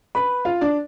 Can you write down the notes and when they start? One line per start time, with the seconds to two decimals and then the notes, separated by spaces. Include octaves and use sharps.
0.15 B4 B5
0.45 F4 F5
0.61 D4 D5